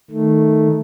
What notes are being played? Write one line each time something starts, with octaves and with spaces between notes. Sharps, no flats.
D#3 A3